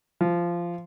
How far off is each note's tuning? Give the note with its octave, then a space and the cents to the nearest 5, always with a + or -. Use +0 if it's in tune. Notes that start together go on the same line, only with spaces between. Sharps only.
F3 -15